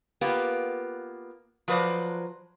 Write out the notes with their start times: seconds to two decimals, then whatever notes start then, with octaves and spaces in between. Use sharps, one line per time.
0.21 A#3 B3 F4 G4 B4
1.68 F3 F#3 B4 C5 D5